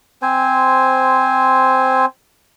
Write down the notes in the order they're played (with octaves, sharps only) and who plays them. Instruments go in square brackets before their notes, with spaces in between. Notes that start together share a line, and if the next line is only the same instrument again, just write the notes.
[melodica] C4 C5 G#5